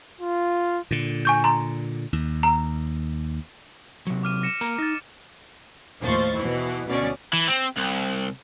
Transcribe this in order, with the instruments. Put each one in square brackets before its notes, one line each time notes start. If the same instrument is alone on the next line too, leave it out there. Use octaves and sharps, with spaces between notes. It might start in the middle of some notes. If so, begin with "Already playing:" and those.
[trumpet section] F4
[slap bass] A#2 D3
[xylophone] G#5 C#6 G6
A#5 C6
[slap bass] D#2
[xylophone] A#5
[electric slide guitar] C3 F#3
[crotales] D6 F6 D#7
A#6 C#7 E7
[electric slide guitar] A#3 A#4 A#5
[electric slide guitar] D#4 [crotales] A6 A#6
[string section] D#2 A2 F3 C5 C#6 A6
B2 E3
D2 B2 C#4 D5
[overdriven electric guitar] E3
C4
C2